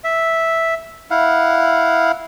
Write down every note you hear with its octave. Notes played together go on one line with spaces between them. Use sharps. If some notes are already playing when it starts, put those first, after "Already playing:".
E5
E4 F5 F#5